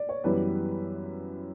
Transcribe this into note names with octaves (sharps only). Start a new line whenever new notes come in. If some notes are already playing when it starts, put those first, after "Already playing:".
Already playing: D5
C#5
F#2 E3 G3 B3 B4